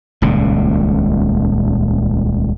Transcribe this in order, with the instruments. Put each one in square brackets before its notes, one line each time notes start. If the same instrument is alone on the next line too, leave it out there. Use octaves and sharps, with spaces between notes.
[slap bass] D#1 C#2 A#2